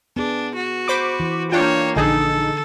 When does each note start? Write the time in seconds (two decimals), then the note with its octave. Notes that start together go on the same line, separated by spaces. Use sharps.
0.16 B3 D4 G#4
0.55 F#4
0.88 C5 B5 D6
1.20 E3
1.52 A#3 D4 F4 C#5 G5
1.96 A#1 D3 D#4 G#4 A4